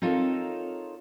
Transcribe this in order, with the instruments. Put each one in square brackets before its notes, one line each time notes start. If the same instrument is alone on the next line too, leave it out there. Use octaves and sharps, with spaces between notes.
[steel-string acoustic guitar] C4 D#4 F4 A4 A#4 C#5